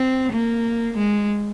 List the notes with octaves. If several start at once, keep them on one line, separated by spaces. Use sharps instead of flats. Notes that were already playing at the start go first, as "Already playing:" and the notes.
Already playing: C4
A#3
G#3